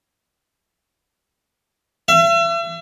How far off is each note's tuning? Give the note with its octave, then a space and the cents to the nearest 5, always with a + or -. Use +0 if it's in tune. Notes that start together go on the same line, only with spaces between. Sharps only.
E5 +40